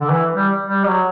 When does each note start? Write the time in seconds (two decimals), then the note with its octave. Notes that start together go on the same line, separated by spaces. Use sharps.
0.01 D3
0.10 E3
0.35 G3
0.67 G3
0.85 F#3